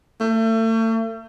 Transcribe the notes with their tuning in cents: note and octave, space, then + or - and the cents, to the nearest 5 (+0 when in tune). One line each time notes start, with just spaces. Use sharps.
A3 +35